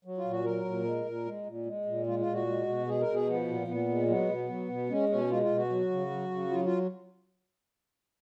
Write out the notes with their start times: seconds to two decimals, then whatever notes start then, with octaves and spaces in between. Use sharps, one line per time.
0.05 F#3
0.18 F4
0.24 A#2
0.31 F#4
0.44 F#3 A#4
0.64 A#2
0.85 G#3
1.05 A#2
1.26 G#3
1.46 A#2
1.66 G#3
1.86 A#2
2.06 G#3 F4
2.19 F4
2.26 A#2
2.33 F#4
2.47 G#3
2.67 B2
2.87 G#3 G#4
3.01 A#4
3.07 B2
3.14 G#4
3.28 F3 B3
3.48 A#2
3.67 A#2 B3
3.88 G#3
4.08 F#3 B3
4.29 B2
4.49 F#3
4.69 B2
4.89 G#3 C#4
5.09 B2 C#4
5.30 G#3 F4
5.43 F4
5.50 B2
5.56 F#4
5.69 F#3
5.91 C#3
6.10 F#3
6.31 C#3
6.51 F#3 F4
6.65 F4